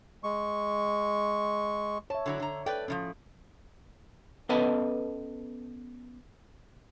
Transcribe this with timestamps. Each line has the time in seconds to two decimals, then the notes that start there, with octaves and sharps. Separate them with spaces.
0.24 G#3 C#6
2.10 C#5 E5 A5
2.26 D3 F#3 E4
2.40 D3 A#5
2.66 A4 B4 D5 G5
2.88 A2 D#3 F3 C#4
4.49 B3 C#4 A4 B4 D#5 A5